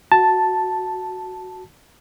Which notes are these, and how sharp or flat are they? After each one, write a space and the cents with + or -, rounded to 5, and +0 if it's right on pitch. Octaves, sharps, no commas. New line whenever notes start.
F#4 +0 A5 +0